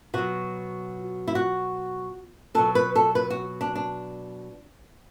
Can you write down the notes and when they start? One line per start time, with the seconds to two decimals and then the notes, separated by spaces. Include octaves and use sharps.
0.14 B2 F#3 F#4
1.28 E4
1.35 F#4
2.55 B2 F#3 A4
2.75 B4
2.95 A4
3.15 B4
3.30 F#4
3.61 D4
3.75 D4